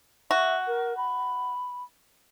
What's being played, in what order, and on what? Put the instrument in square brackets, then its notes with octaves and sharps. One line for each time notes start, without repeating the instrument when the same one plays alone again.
[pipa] F#4 [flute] E5
[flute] A#4
B5